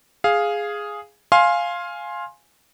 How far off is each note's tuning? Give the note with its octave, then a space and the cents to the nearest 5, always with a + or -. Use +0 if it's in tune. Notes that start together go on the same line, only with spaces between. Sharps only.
G#4 +0 F5 +0
F5 +0 G#5 +5 C6 +20